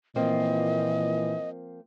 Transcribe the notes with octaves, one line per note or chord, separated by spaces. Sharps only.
A#2 E3 F3 A#3 C4 D#5